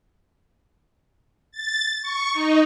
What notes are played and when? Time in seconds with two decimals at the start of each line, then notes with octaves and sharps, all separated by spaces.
1.51 A6
2.02 C#6
2.32 D#4